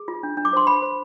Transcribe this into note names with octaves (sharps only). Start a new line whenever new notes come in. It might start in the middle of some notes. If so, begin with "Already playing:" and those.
Already playing: G#4
F4
D4
D4
D6
C5 C6
C5 B5
C5